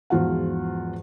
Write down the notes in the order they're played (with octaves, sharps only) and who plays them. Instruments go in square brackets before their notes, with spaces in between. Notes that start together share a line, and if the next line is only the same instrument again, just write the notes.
[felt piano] E2 G#2 F3 F4 F#4 F#5